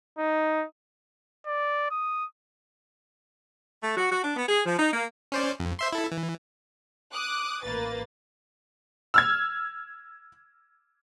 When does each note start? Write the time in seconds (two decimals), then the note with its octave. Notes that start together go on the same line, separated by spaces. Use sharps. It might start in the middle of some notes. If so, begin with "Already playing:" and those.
0.18 D#4
1.47 D5
1.91 D#6
3.83 A3
3.97 F#4
4.12 F#4
4.24 D4
4.36 B3
4.48 G#4
4.66 F3
4.79 D#4
4.93 A#3
5.32 C#4 C5 D5
5.60 F2
5.79 C5 E5 C6
5.93 E4 A4
6.12 E3
7.13 D6 D#6 F#6
7.64 A1 A#3 B4 A6
9.14 E6 F6 G#6